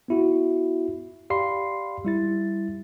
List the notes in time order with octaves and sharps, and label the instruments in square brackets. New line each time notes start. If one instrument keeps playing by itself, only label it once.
[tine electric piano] B3 E4 F#4
G4 D5 F5 B5 C6 C7
G3 E4 A6